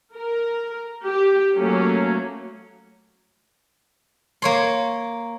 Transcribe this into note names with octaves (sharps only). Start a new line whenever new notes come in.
A#4
G4
F#3 A3 A#3 C#4
A#3 C#5 C6